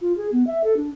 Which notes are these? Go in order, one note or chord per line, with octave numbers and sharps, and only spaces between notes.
F4
G#4
B3
E5
A4
D4